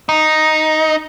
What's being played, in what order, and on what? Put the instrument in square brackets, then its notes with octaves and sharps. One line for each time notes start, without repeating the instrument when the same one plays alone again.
[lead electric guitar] D#4